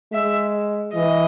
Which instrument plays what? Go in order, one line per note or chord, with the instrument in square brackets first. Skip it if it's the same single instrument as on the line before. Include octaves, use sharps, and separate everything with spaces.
[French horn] G#3 [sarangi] E5
[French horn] E3 [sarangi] D#5